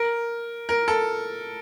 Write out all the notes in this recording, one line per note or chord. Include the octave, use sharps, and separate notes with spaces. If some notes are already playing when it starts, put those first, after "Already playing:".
Already playing: A#4
A#4
A4